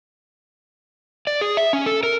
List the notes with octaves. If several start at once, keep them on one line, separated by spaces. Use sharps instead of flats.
D5
G#4
E5
C#4
A4
A#4